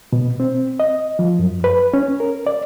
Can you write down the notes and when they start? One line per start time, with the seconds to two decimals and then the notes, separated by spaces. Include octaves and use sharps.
0.13 B2
0.40 C4
0.80 D#5
1.19 F3
1.39 F#2
1.64 B4
1.94 C#4
2.20 A#4
2.47 D5